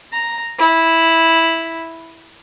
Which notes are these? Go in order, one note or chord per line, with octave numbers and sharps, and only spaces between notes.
A#5
E4